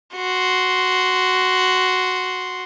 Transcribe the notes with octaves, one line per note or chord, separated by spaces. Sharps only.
F#4 C6